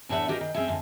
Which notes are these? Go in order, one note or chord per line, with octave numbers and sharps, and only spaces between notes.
E2 A2 D4 B4 E5 F#5
F#4 G4 A#4 C5 D5 D#5
D#3
C4 C#4 F4 G#4 E5
F2 G#2 D3